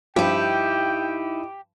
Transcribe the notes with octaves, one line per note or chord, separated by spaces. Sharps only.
G2 F3 D#4 E4 G4 G5